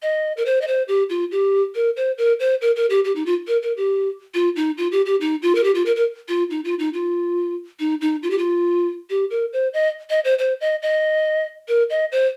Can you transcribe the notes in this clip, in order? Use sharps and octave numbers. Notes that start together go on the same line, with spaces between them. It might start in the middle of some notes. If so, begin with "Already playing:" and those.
D#5
A#4
C5
D#5
C5
G4
F4
G4
A#4
C5
A#4
C5
A#4
A#4
G4
G4
D#4
F4
A#4
A#4
G4
F4
D#4
F4
G4
G4
D#4
F4
A#4
G4
F4
A#4
A#4
F4
D#4
F4
D#4
F4
D#4
D#4
F4
G4
F4
G4
A#4
C5
D#5
D#5
C5
C5
D#5
D#5
A#4
D#5
C5